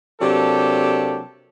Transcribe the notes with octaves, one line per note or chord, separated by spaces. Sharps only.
C3 F#3 A#3 D4 G4 A4